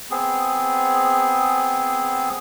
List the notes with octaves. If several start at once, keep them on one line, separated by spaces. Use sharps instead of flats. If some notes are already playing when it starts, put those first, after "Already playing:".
B3 C4 G#4